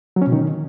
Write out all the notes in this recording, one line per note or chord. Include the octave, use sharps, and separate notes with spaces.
F#3
C#4
B2
D#3